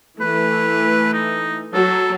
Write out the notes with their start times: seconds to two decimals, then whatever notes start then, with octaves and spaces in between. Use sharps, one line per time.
0.21 E3 A3 B4
1.14 D#4
1.74 F#3 A4